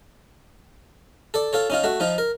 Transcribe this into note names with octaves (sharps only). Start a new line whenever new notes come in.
A4 D5
F4 A4 C#5
C#4 D#4 F4
A3 F#4
F3 D#4 F4
A#4